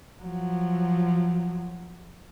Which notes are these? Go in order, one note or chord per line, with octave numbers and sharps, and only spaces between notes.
F3 F#3